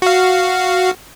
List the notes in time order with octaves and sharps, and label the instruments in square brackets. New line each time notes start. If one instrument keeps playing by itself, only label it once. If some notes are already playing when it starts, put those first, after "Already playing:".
[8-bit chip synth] F#4 F5